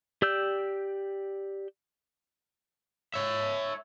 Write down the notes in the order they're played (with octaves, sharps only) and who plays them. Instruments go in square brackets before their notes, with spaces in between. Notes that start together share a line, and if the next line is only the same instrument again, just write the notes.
[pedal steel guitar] G4 D5 E6 G6
[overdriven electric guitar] C#5 E5